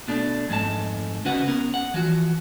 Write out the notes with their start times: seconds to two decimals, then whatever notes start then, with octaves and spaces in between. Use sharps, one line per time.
0.08 B2 A3 D4
0.49 F2 G#2 A3 A5
1.25 C#3 C#4 F#4 B4 F#5
1.48 B3 C#4 A#4
1.74 F#5
1.94 E3 F3 F#4